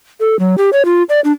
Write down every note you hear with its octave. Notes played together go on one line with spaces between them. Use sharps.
A4
F#3
G4
C#5
F4
D5
D4